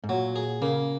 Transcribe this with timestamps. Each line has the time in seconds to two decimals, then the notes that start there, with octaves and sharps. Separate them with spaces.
0.04 G#2
0.09 A#2 F#3
0.36 G#4
0.62 C#3 A#3